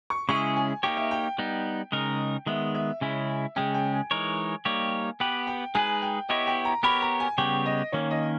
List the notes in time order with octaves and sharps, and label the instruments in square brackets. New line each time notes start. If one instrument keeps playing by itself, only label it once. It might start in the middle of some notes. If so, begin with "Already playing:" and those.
[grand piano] C#6
[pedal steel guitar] C#3 G#3 C#4 E4 G#4 [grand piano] C#6
[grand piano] G#5
[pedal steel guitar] A#3 D#4 G4 C#5 [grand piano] G5
[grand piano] E5
G5
[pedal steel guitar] G3 B3 D#4
C#3 G#3 D#4 A#4
[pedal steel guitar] D#3 G#3 B3 [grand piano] E5
[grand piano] E5
[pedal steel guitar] C#3 G#3 C#4 E4
[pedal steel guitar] C#3 G#3 C#4 [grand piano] G5
[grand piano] G5
G#5
[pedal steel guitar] E3 G#3 D#4 A#4 C#5
G3 A#3 D#4 G4 C#5
[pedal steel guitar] B3 G4 B4 [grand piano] G5
[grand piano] G5
[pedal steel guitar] G#3 D#4 G#4 B4 [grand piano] G#5
[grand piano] G5
[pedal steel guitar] B3 E4 G4 C#5 [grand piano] D#5
[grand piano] G5
A#5
[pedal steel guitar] B3 G4 A#4 C#5 [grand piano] B5
[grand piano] A#5
G#5
[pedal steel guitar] C#3 G3 B3 G4 C#5 [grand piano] G5
[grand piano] D#5
[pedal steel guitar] D#3 A#3 C#4 [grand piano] C#5
[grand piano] D#5